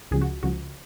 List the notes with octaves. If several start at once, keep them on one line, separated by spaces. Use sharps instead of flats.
C#2 C#3 F3 G#4
F#4
C#2 C#3 F3 F#4